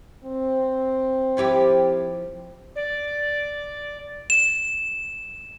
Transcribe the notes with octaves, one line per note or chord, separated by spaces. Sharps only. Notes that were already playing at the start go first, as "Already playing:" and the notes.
C4
F3 E4 G4
D5
E7